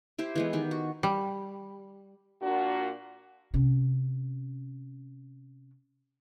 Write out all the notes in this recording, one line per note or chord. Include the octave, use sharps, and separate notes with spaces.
E4 G4 C5
E3 G#3 B3
D#3 G4
F#4
G3
A#2 D4 F#4
C3 C#4